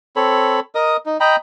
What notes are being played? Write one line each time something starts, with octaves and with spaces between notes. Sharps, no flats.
C4 A4 C#5 B5
A#4 D#5 D#6
D#4
D#5 G5 A#5 B5